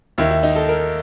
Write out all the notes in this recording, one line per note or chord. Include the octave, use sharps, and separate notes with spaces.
D#2 D#3 E4
E4
D#4
A4
A#4